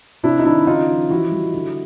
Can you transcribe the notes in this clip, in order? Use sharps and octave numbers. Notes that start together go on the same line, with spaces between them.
C3 D4 E4
D#4
D#3 D4 E4
C#3 D#4 F4
F3
E3 E4 F#4
G3
D3